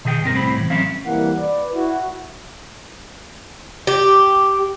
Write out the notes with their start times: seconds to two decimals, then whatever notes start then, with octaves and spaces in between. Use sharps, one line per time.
0.05 B2 D#3 G#4 E5 G5
0.22 C2 G2 C4 A#4
0.34 C2 A2 C4 C5 B5
0.57 A2 E3
0.70 F#3 C4 C#4 E5 F5
1.04 C2 E3 A#3 F#5
1.38 B4 D5
1.73 E4 F#4
3.87 G4